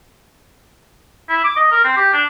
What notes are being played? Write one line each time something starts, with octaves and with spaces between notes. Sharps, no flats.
E4
D6
D#5
A#4
C4
G4
D4